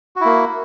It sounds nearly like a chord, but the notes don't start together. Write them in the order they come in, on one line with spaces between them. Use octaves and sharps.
F#4 E4 A#3